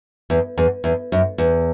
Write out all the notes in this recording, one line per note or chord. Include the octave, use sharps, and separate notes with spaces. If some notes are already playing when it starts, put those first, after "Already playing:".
E2
E2
E2
F#2
E2